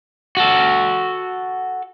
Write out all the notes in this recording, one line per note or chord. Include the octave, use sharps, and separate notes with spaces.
F#4 A4